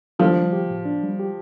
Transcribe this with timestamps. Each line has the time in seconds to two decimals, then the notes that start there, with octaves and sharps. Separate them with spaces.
0.19 F3 D4
0.36 G3
0.53 G4
0.70 A2
0.86 D4
1.03 G3
1.19 G4